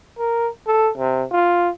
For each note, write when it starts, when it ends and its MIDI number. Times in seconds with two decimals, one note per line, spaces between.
0.19 0.48 70
0.67 0.90 69
0.98 1.24 48
1.32 1.69 65